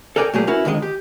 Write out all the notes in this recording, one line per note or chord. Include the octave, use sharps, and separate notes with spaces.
A4 A#4 D5 G5 G#5
A#2 F#3 A3 A#3 G4 G#4
C#4 E4 F#4 A#4 B4
F2 D3 D#3 F3 G#3 D#5
G4